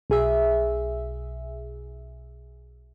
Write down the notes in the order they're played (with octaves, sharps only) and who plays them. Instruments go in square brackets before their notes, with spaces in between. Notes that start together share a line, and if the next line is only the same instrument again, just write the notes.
[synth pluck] B1 G#4 E5